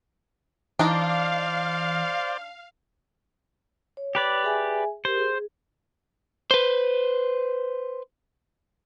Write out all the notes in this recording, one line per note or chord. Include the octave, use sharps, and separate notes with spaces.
E3 D4 D#4 C5 D5 D#5 F5
C#5
G4 B4 D5
G#4 E5 G#5
G4 A#4 C5
G#4
B4 C5